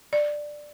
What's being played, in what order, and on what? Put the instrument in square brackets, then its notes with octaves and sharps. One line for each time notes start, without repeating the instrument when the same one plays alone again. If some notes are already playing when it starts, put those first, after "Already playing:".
[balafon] D5